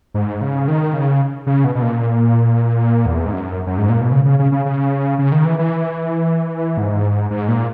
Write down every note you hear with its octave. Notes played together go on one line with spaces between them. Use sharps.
G#2
C#3
D#3
C#3
C#3
B2
B2
A#2
E2
G#2
F#2
F#2
G#2
A#2
B2
C#3
C#3
C#3
C#3
C#3
C#3
D#3
E3
E3
G#2
G#2
A#2